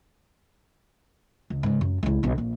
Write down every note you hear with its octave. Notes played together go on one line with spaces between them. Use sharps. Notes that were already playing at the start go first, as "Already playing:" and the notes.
C#2
G#2 C#3
F#2
C#2 E4
B1 D4
A#1